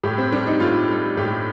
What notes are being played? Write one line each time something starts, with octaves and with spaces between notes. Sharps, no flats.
A2 G4
C4
G3 D4
D#4
A2 F4
G3
A2 G4